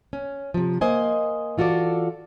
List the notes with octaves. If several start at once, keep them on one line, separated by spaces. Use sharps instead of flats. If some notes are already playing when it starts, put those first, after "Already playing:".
C#4
C3 F3
A#3 C5 D#5 G#5
E3 F4 F#4 A4 D5